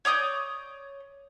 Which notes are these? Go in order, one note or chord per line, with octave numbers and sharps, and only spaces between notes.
C#5 D5 D#6 G6